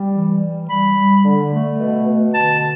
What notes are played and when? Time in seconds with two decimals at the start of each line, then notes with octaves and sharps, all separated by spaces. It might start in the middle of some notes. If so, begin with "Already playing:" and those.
Already playing: G3
0.14 E3
0.42 G3
0.69 G3 B5
0.97 G3
1.24 D3
1.52 A3
1.80 B2
2.07 B2
2.34 D3 A5